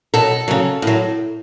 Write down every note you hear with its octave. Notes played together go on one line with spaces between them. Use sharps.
B2 F#3 A4
C#3 F#3
A2 F#3